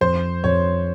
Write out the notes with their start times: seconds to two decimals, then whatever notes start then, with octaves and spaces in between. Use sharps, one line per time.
0.01 F2 C5
0.44 F2 C#5